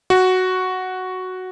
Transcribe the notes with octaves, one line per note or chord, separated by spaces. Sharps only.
F#4